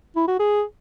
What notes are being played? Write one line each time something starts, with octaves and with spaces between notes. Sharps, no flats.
E4
F#4
G#4